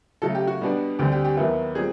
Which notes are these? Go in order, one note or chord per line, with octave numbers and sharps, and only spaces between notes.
C#3 F#3 A3 A4
G4
F#4
B2 G3 B3 D4
D2 D3 G3 C4 G4
G4
G4
D#2 D#3 F#3 B3 E4
A#2 G3 C4 G#4